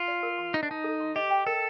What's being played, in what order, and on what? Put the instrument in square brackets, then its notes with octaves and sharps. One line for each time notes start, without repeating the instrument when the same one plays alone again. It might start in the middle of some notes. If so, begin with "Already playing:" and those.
Already playing: [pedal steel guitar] F4
[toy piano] D5
A#4
C6
[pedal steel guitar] D#4 [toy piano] D#5
[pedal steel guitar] D4
[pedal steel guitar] D#4 [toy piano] A5
[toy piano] A4
C6
[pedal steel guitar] G4 [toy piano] D#5
[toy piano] G5
[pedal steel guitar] A4 [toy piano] A#4